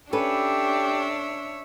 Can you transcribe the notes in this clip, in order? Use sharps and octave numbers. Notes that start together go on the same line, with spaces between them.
C#4 D4 G4 A4 B4 C#5 E5